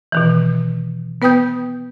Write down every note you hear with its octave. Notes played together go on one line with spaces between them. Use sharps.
B2 D#3 E3
B3 B4 G5 D#6 G6